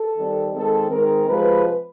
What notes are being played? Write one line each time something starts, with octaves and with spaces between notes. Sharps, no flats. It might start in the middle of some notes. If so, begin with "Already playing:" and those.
Already playing: A4
D#3 G3 C4
D#3 G#3 C4 A4
D#3 G#3 C4 A#4
C3 F3 G#3 B4